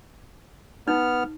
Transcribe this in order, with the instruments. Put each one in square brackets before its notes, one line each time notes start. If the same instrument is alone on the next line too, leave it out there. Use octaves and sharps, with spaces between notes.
[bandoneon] B3 F6 [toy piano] D#4